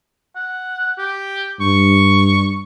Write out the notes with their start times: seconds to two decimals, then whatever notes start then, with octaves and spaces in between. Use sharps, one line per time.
0.36 F#5
0.98 G4
1.61 G2 C#6